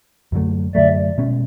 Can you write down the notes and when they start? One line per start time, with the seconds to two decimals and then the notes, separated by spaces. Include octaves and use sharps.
0.32 F#2 D3 F#3 A3
0.75 F#2 D3 F#3 A3 D5 E5
1.18 B2 G#3 C#4